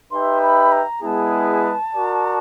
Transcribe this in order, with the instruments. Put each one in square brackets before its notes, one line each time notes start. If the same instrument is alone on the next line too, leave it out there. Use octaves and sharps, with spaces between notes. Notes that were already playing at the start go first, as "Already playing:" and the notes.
[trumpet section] D#4 G4 B4 E5 G5 [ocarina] C6
[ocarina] B5
A#5
[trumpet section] G#3 B3 E4 G#4 B4 [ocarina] A5 A#5
[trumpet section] F#4 A#4 D5